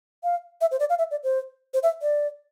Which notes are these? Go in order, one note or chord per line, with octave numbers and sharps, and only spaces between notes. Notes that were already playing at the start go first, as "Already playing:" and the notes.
F5
E5
C5
D5
F5
E5
D5
C5
C5
E5
D5